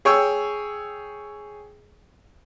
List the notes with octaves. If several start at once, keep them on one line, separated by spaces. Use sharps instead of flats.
G#4 C#5 G5 C#6 E6